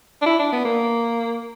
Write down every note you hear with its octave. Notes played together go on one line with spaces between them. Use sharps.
D4
E4
D4
B3
A#3